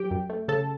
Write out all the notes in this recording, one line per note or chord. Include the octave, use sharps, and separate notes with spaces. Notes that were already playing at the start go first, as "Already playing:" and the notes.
Already playing: F#3 G4 G5
F#2
A3
C#3 A4 A5